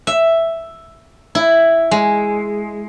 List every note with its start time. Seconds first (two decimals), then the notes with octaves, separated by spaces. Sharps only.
0.07 E5
1.35 E4
1.91 G#3